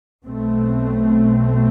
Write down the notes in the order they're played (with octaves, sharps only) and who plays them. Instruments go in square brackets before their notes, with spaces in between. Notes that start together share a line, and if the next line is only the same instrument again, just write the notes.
[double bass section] B1 B2 A3 C4